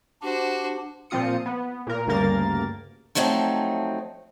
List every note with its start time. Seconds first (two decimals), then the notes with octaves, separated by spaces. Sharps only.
0.22 D4 F#4 G4 C5
1.10 A#2 F3 C4 F4 D#6 C#7
1.46 B3
1.87 A#2 A#4
2.07 D2 G2 C#3 A#3 A#4 A6
3.15 F3 F#3 A3 C4 D#4